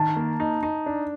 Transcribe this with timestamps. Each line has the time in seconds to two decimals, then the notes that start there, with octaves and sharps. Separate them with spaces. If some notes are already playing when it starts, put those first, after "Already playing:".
Already playing: D#3 A5
0.17 A#3
0.40 D#4
0.63 D#4
0.86 D4